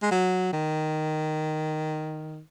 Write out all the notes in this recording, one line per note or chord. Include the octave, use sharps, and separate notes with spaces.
G#3
F#3
D#3